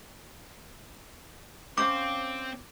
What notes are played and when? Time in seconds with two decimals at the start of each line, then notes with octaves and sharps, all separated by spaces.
1.78 C4 C#4 C5 F5 D6